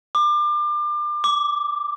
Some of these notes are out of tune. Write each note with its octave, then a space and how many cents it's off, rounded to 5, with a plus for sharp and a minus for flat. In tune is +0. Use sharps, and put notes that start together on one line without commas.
D6 +30
D6 -5